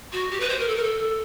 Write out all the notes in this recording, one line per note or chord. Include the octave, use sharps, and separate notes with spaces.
F#4
G4
B4
C5
A#4
A4
A#4
A4